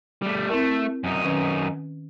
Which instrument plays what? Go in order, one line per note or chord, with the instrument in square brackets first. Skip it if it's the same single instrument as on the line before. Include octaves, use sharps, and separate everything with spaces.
[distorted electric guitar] G3 A3
[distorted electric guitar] A3 [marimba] C4 E4 A#4
[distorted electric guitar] F#2 D#4
[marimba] D#3 C#4 B4